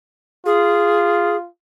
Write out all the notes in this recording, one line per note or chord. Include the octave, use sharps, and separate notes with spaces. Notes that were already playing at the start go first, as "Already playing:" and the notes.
F4 G#4